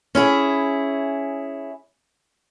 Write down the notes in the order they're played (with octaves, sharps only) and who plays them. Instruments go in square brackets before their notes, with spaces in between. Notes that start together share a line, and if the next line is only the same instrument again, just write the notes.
[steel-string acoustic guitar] C#4 E4 G#4